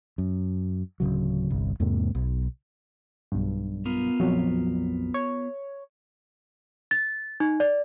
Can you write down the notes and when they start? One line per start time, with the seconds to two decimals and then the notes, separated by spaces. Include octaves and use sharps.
0.18 F#2
1.00 D1 C#2 C#3 F#3
1.50 G1 C2
1.80 E2 G#2 C3 A#3
2.15 B1
3.32 B1 G2
3.86 B3 F4 A#4
4.20 A#1 F2 F#3
5.14 C#5
6.91 A6
7.40 D#4
7.60 D5